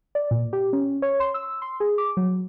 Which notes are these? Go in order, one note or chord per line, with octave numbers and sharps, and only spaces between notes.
D5
A#2
G4
C#4
C#5
C6
E6
C6
G#4
D6
F#3